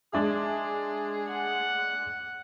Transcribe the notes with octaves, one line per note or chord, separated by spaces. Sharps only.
G#3 D4 G#4 E5
F#5